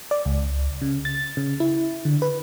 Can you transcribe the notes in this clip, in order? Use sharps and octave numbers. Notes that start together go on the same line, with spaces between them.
D5
C#2
C#3
A6
C#3
E4
D3
B4